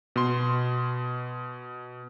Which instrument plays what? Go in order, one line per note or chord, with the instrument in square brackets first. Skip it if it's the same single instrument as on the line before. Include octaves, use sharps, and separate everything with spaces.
[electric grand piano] B2 C6